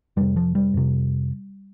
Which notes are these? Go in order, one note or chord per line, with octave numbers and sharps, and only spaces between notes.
F2 C3 G3
F3
G3
F2 C3